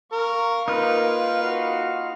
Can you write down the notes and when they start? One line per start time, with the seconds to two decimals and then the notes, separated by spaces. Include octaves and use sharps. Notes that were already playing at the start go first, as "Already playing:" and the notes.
0.12 A#4 F5 C#6
0.68 A#3 D#4 F4 A#4 B4
1.43 F#4 F5